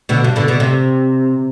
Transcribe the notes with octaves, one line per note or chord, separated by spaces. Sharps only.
B2 D3
G2
B2 D3
B2 D3
C3